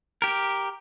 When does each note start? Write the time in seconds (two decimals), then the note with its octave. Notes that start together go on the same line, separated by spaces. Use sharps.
0.22 G4 A#4